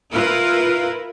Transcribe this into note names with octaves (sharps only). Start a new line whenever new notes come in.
E4 F4 A#4 B4